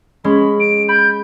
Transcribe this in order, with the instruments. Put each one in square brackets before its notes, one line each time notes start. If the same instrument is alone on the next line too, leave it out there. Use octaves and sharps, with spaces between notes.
[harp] G#3 C#4 [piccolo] B5
[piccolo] D7
[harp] B5 [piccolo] G6